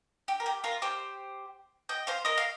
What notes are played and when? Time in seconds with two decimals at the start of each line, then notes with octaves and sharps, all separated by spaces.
0.28 G4
0.40 A#4
0.46 G4
0.64 F4 A#4
0.82 G4 C5
1.89 D#5 G5
2.07 C5 F5
2.25 A#4 D#5
2.38 F5